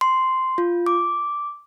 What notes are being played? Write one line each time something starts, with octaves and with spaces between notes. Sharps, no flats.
C6
F4
D6